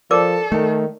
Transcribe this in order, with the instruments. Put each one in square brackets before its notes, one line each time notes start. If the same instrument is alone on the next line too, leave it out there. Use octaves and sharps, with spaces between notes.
[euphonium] F3 [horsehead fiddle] A4 [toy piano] A#4 D5 D6
[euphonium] D#3 [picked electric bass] A3